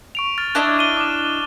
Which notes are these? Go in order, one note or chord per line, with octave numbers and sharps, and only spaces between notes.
C#6 D7 F7
F6 A6
D4 E4 D#5 F#6
A6 D#7 G7
D6 E7